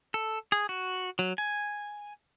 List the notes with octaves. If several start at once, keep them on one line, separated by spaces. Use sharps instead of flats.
A4
G#4
F#4
F#3
G#5